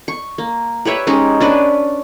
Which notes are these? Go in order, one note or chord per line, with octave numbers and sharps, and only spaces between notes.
C#6
A#3
G4 B4 C#5 E5
G#3 C#4 D#4 G4
C#4 D4 B4